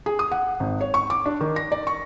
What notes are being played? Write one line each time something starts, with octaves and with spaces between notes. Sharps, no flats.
G#4
D#6
F#5
G#1
C#5
C#6
D6
D4
D#3
A#6
D5
C#6